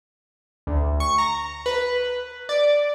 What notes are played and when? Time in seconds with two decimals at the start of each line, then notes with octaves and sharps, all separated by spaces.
0.67 D2
1.00 C#6
1.18 A#5
1.66 B4
2.49 D5